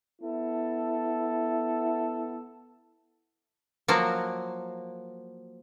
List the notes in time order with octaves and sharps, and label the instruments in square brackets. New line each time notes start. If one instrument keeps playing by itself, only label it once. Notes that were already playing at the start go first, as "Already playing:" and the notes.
[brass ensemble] B3 E4 A4
[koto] F3 F#3 A#3